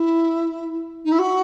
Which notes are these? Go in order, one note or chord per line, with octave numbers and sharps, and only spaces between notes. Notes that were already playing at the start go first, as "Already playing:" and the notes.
Already playing: E4
D#4
E4
F#4